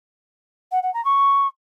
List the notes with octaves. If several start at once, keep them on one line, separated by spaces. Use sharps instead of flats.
F#5
F#5
A#5
C#6